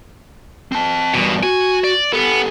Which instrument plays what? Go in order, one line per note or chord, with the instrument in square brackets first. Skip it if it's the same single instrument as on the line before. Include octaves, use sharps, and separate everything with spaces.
[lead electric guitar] C4 A5
[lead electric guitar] E2 G2 [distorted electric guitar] B2
[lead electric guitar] F#4 [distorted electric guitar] G#5
[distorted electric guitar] D5
[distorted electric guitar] B3 [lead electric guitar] G4 A4